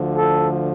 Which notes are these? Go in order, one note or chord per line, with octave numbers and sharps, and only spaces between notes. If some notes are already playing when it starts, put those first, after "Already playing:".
Already playing: D2 D3 F3
A4